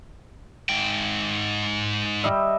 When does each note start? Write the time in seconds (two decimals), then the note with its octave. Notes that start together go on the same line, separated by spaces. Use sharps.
0.69 G#2 G5
2.24 G3 D#5 E5